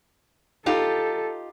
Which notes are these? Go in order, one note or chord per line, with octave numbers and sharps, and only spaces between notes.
D#4 F4 G4 A4